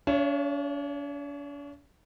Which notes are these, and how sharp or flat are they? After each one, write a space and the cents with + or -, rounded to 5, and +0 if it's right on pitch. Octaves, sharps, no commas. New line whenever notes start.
D4 -45 C#5 +5 E5 +45